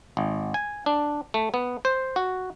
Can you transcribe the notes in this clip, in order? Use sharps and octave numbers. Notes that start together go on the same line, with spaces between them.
G#1
G#5
D4
A3
B3
C5
F#4